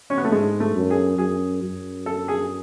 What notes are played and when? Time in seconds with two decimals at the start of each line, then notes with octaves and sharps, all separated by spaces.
0.10 C#4
0.18 B3
0.25 A3
0.32 G#2 G#3
0.60 A3
0.75 F#2
0.90 G#4
1.18 F#2 G#4
1.62 F#2
2.06 A4
2.28 G#4